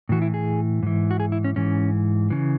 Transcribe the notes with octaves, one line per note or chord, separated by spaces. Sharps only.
A2 E3 F#4
E4
G#4
G#2 E3
F#4
G#4
E4
C#4
G#2 E3 C#4
C#3 E3